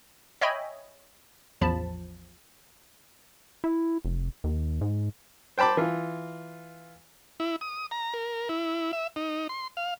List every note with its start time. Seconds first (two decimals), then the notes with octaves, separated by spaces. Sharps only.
0.41 C#5 D#5 E5 G5 G#5 B5
1.61 A1 E2 F3 A5 B5
3.64 E4
4.05 F1
4.44 D#2
4.81 G#2
5.58 C5 G5 A5 B5 D6
5.77 E3 F4
7.40 E4
7.61 D#6
7.91 A#5
8.14 A#4
8.49 E4
8.93 E5
9.16 D#4
9.49 C6
9.77 F5